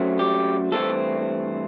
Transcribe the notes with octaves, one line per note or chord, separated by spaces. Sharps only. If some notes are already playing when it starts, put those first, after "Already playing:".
Already playing: F#2 F#3 A3 C4
G4
G2 E3 A3 C4 A4